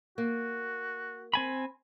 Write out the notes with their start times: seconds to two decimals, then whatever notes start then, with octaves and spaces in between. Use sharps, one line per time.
0.18 A#3 F#4
1.34 C4 G#5 B5